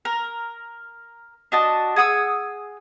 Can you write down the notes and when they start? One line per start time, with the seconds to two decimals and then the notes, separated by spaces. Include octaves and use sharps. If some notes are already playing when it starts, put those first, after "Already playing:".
0.05 A#4
1.52 D4 F#4 D#5 A5
1.96 G#4 F#5 D#6 E6